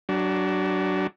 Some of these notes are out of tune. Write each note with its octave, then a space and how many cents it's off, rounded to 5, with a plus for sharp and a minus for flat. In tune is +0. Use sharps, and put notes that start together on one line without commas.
F#3 +25 D4 +0